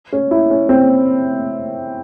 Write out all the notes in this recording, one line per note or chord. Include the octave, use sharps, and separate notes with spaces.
C#4
E4
C#4
C4